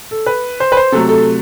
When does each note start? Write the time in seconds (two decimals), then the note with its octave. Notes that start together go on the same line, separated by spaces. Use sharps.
0.11 A4
0.26 B4
0.60 C5
0.72 B4
0.77 C5
0.92 C3 F#3 A3 A4
1.09 A4